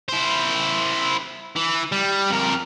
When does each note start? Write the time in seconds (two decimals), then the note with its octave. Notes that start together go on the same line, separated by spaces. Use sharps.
0.09 E4 C5
1.56 E3
1.92 G3
2.30 F2 A#4